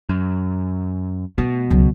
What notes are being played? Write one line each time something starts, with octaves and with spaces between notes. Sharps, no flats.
F#2
B2 A3
C#2 F#3